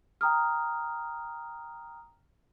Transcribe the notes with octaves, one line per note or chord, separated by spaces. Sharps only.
G5 A#5 D#6 F6